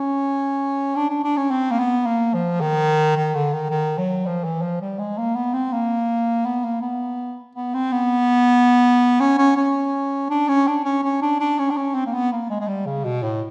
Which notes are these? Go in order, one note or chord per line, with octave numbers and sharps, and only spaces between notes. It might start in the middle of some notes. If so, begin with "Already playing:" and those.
Already playing: C#4
D4
D4
D4
C#4
C4
A#3
B3
A#3
F3
D#3
D#3
D3
D#3
D#3
F#3
F3
E3
F3
G3
G#3
A#3
B3
C4
A#3
B3
A#3
B3
B3
C4
B3
C#4
C#4
C#4
D4
C#4
D4
C#4
C#4
D4
D4
C#4
D4
C#4
C4
A#3
B3
A#3
G#3
G#3
G3
C#3
B2
A2